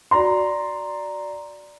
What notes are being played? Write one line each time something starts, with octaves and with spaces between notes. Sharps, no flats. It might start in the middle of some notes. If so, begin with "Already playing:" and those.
F#4 D5 A#5 C6